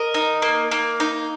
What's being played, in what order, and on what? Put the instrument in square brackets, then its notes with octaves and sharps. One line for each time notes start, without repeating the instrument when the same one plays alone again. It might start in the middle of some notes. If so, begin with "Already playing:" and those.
Already playing: [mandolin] A#4 D#5
D#4
A#3
A#3
D#4